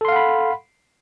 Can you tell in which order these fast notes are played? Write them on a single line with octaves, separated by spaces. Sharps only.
A4 C6 F5 F#5 B5